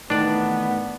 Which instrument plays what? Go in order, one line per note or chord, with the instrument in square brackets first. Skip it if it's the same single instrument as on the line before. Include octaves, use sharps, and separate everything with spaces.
[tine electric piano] A2 D#3 E3 [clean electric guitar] A3 D#4 [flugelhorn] B3 [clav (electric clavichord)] D4 D5